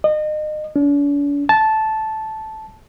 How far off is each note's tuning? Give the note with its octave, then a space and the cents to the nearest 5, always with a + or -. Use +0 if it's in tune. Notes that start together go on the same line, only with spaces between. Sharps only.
D#5 -30
D4 -45
A5 -10